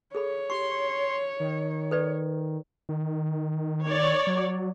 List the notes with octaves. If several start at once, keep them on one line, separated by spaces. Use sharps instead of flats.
G#4 A4 C#5 B5
G4 C6 C#6
D#3
A4 B4 D5
D#3
C#5 D5
F#3